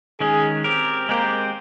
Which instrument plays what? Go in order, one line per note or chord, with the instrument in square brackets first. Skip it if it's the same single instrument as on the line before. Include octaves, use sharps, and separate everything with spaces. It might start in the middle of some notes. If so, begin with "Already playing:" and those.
[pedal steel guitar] D#3 G#3 C#4 [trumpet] G#4
[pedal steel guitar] C4 G4 A#4
[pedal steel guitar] G#3 C4 G4 C5 [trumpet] A#3